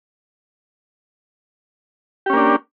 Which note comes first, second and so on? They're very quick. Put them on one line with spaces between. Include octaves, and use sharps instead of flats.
G4 C#4 A#3 D4